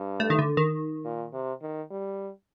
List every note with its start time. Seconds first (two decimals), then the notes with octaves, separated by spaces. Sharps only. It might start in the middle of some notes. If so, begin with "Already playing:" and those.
Already playing: G2
0.20 A3
0.30 D#3
0.39 D3
0.57 D#3
1.05 A#2
1.33 C3
1.62 D#3
1.90 G3